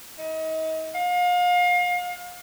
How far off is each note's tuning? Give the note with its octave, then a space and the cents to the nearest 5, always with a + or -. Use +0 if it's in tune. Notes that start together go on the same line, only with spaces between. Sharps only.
D#4 +35
F5 +35